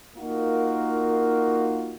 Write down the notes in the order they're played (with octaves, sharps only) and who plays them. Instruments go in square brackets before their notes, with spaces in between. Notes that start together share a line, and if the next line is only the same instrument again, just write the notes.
[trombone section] A#3 D#4 F4 F#4 A#4